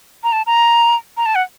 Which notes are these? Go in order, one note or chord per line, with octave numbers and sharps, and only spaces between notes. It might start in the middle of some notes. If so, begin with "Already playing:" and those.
A#5
A5
A#5
A#5
A5
F#5